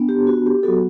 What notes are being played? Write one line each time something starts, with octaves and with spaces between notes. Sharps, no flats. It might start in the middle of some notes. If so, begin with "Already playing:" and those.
Already playing: B3 D4
G4
F#4
G4
F#3 B3 F#4 A4